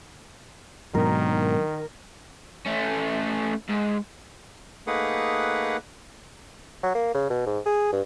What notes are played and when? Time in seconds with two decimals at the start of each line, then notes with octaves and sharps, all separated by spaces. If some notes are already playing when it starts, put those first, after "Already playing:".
0.95 G#2 B2 D#3 F#3 D4 A#4
2.66 A3 C#4
3.69 G#2
4.87 A3 A#3 D#4 G#4 B4 F#5
6.83 F#3
6.95 A#3
7.14 C#3
7.30 B2
7.46 G#2
7.66 G#4
7.92 G2